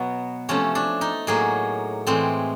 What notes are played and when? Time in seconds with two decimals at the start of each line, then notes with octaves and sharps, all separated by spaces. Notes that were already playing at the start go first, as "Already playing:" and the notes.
Already playing: B2 F#3 B3
0.49 C3 F3 A3 C#4
0.75 D4
1.01 D#4
1.27 A2 F#3 A#3 G#4
2.07 A2 E3 G#3 C4